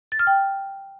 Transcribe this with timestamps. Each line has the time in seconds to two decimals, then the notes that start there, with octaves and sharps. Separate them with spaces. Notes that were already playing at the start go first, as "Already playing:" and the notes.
0.12 A6
0.19 F6
0.27 G5